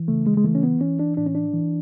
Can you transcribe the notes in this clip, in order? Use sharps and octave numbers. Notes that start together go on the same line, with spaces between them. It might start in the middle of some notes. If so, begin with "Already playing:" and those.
Already playing: E3
C#3 A3
G#3
G#3
E3 A3
C#4
B3
E3 C#4
D4
A2 D4
C#4
D4
E3